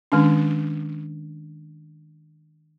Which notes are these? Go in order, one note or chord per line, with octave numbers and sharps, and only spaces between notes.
D#3 G#3 C#4 D4